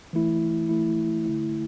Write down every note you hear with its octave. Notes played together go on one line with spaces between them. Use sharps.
E3 A3 E4
E3 A3 E4
D3 A3 E4